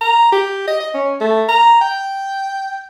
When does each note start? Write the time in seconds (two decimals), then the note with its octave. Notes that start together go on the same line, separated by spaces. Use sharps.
0.01 A#5
0.32 G4
0.67 D#5
0.80 D#5
0.94 C#4
1.20 A3
1.48 A#5
1.81 G5